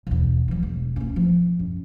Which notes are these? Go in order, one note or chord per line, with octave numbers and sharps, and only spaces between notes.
E1 E2
E3 F#3
E1
A#3 C#4
F3
F#2